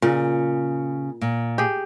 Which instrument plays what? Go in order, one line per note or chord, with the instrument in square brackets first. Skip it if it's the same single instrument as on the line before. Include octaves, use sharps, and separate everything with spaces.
[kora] A#2 [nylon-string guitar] C#3
[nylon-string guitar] A#2
[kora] G4 G#4